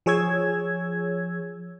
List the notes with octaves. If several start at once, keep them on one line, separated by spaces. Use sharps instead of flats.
F3 G#4 C#5 E6 G#6